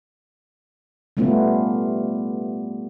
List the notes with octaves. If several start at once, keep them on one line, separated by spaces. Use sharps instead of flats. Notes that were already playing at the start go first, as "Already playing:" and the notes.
G3 A3 B3 C#4 F4